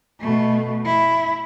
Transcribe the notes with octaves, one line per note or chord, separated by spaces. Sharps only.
B2 A3
E4